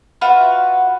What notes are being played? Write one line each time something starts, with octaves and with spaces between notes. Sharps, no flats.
F4 F#4 B4 E5